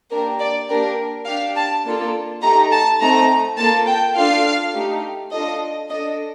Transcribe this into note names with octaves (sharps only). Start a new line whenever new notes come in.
A#3 D4 G4 A#4
D5
A#3 D4 G4 A#4
D4 G4 F5
A5
A#3 D4 F4 A4
A3 D#4 G4 A#5
A5
A3 C4 D#4 A4 A#5
A#3 F4 A4 A5
G5
D4 F4 A4 F5
A3 D#4 G4
D4 F4 A4 D#5
D4 A4 D#5